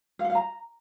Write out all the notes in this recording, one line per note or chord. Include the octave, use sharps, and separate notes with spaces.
F5
F#5
F5
A#5